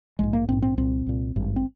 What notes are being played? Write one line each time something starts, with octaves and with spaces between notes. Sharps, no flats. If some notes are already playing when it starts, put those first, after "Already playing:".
A#1 G#2 G#3
A#3
A#1 G#2 C4
C4
C2 A#2 C4
C2 A#2
G#1 G2
C4